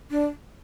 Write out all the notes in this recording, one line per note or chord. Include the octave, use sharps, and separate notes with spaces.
D4